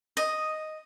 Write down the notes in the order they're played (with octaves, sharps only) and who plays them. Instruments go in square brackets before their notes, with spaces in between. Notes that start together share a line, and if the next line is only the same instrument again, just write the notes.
[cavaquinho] D#5 [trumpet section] D#6